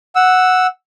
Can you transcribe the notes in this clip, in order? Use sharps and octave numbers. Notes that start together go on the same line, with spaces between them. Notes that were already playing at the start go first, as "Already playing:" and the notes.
F#5 E6